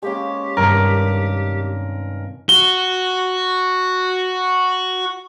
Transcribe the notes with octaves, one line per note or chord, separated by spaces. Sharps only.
G#3 A#3 C#4 G4
G2 C3 D#3 A#4
F#4 G7